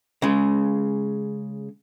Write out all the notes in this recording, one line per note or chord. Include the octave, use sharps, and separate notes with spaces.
C#3 G#3